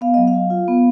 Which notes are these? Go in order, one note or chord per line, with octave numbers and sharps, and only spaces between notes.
B3 F5
F#3 D#5
F5
F#3
F4
B3